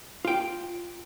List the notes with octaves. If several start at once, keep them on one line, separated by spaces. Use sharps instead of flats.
F4 G5